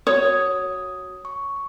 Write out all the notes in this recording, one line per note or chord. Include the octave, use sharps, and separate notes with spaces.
F#4 C#5 D#6
C#6